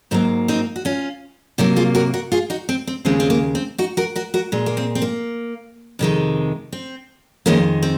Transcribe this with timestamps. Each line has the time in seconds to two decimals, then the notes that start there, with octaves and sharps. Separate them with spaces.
0.11 G#2 F#3 A#3 C4
0.48 C4 D#4
0.76 F#4
0.85 C#4 F4
1.58 C3 F#3 A#3 D#4 F#4
1.76 F4 G#4
1.95 F#4 A#4
2.14 F#4 A#4
2.32 F4 G#4
2.50 D#4 F#4
2.69 C4
2.87 C4
3.05 D#2 C#3 G#3 C4
3.20 C4
3.30 A#3
3.55 C4
3.78 D#4 F#4
3.97 F#4 A#4
4.16 F#4 A#4
4.34 F#4 A#4
4.52 A#2 G#3
4.66 A#3
4.77 C4
4.95 C4
5.02 A#3
5.99 F2 C3 D#3 G#3
6.72 C4
7.46 F2 D#3 G#3 A#3 C#4
7.83 C4